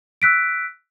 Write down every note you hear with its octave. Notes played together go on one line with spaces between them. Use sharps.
E6 F#6 B6 D7